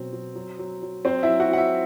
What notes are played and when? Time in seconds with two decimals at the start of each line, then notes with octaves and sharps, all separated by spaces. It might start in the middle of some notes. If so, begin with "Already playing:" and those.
Already playing: B2 F#3 C4
0.13 F#3
0.35 F#3
0.59 F#3
0.82 F#3
1.05 F#3 C4 C5
1.23 E4 E5
1.29 F#3
1.40 F#4 F#5
1.52 F#3 F#5
1.57 E4 E5